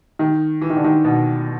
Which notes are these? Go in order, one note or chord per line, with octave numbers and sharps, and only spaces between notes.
D#3
E3
D#3
D3
D#3
B2